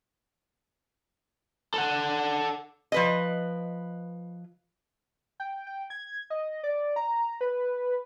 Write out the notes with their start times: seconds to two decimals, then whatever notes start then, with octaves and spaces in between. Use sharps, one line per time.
1.74 A4 F#5
2.92 F3 B4 D#5
5.40 G5
5.67 G5
5.90 G#6
6.30 D#5
6.63 D5
6.96 A#5
7.41 B4